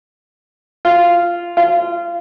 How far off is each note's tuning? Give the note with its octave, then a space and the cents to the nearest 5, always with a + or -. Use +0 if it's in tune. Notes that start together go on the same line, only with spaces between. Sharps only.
F4 -10
F4 -25